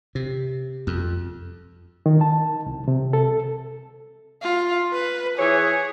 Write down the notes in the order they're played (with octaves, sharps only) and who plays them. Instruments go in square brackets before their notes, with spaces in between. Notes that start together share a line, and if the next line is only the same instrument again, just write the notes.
[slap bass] C3
F2
[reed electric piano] D#3
A5
C2
C3
A4
[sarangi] F4
B4
[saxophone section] E3 C#5 [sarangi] G#4